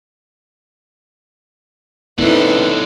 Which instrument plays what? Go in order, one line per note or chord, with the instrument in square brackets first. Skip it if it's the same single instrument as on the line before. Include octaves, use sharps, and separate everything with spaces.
[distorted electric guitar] F#2 D3 [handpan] A#3 C4 E4 [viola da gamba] D#4 A4 [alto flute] B4